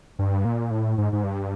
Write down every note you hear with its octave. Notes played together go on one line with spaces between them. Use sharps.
G2
A#2
A2
G#2
G#2
G2